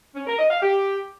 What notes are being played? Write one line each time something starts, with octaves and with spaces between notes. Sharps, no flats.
C#4
A#4
D#5
F5
G4